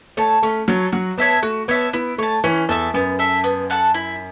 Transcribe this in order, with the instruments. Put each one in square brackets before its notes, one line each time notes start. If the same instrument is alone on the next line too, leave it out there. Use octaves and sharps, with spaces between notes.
[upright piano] A3 [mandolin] C#5 A5
[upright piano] A3 [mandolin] C#4
[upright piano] F#3 [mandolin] A4 C#5
[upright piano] F#3 [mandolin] F#4
[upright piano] B3 [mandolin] C#5 E5 A5
[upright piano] A3 [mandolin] F#4
[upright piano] B3 [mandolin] C#5 E5 A5
[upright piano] B3 [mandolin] E4
[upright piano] A3 [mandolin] C#5 A5
[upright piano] E3 [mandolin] C#4
[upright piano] E2 [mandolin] A4 E5 A5
[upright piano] F#2 [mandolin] B3
[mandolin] A4 E5
B3
A4 F#5 A5
E4